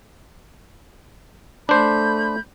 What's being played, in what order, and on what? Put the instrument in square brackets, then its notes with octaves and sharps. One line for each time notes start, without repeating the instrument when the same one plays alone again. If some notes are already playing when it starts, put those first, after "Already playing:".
[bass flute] A3 [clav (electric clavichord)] D4 C5 [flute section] B5 G6